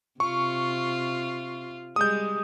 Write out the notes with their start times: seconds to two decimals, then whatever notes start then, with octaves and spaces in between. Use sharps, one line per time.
0.20 C3 F4 C#6
1.96 G3 G#3 D#6 G6